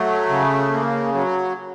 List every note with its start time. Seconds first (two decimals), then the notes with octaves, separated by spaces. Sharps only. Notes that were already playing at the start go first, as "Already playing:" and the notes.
Already playing: F#3 A3
0.29 C#3
0.71 A#3
1.14 F#3